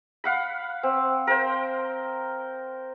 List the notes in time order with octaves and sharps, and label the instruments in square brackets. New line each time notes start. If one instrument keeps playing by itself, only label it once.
[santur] F5 F#5 B5
C4
A#4 C5 G5